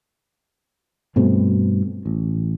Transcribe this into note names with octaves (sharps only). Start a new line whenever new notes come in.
G2 B2 A3 C4
A1